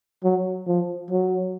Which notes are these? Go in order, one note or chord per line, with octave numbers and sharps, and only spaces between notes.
F#3
F3
F#3